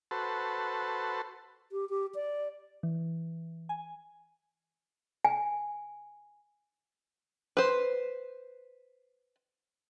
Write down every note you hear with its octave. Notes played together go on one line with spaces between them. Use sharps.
F#4 A4 B4 C5 A5
G4
G4
D5
E3
G#5
G#5
B4 C5